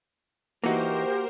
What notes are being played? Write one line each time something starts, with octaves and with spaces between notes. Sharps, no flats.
E3 A#3 D#4 F#4 G4 A#4 C5